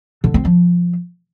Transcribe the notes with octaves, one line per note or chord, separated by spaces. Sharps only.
D3
C4
F3